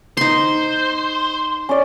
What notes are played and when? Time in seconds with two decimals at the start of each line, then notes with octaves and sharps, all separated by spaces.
0.17 D#4 C5 C6
1.69 C#4 D5